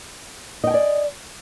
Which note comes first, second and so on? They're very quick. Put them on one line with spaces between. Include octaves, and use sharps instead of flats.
D#5 G5 G#5 D5